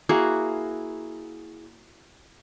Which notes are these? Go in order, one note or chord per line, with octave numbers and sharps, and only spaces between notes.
A#3 E4 F#4 G#4